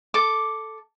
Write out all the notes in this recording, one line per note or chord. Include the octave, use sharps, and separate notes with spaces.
A4 D6